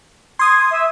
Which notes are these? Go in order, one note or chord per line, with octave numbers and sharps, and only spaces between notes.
C6 D#6 G#6
E5